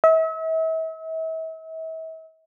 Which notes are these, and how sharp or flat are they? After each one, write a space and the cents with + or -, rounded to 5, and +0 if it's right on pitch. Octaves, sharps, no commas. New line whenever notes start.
E5 -40